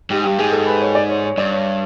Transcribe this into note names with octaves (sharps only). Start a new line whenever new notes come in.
G#2 G4
G2 G4
G#2 G#4
A4
B4
C#5
D5
C#5
C#5
G2 D5
C#5